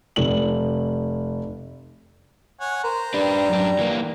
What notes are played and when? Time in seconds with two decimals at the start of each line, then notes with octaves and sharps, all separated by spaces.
0.16 F1 F#7
2.60 C#5 F#5 G#5
2.84 A#4 C5 A#5
3.14 G3 D4 B4
3.49 F#2 D4
3.79 E3 A#3